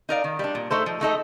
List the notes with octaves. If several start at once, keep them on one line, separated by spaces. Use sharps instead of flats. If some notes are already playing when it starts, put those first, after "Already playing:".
D#4 A#4 D5 F5
D#3
G3 D4
A#2
A3 D#4 A4 C5
F3
A3 D#4 A4 D#5